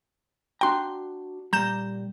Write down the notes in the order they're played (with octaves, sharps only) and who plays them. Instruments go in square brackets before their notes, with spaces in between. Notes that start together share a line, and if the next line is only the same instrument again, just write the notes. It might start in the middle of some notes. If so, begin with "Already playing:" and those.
[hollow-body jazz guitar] D4 F#4 A#5 [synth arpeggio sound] G5 C6
[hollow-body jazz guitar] A#2 G3 [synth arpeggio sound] A#5 G6 E7